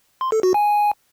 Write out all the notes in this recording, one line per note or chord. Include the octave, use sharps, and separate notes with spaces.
C6
A4
F#4
G#5